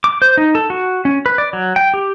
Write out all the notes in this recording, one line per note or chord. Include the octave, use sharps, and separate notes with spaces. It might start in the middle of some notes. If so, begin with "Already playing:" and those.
D6
C5
D#4
A4
F#4
C#4
B4
D5
F#3
G5
G4